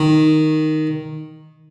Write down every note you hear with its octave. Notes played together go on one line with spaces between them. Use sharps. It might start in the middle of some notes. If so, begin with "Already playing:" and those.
Already playing: D#3